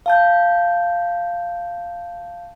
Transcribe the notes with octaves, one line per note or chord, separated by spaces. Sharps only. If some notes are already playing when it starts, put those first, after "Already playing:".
F5 A5 G6